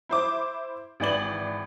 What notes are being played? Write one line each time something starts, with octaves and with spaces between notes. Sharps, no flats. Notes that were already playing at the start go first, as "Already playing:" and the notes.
E4 C5 D6
G#1 E3 D5 F#7